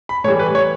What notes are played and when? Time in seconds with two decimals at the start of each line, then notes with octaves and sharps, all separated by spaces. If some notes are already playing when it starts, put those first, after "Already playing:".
0.09 B5
0.24 A2 E3 G3 C#5
0.39 B4
0.55 C#5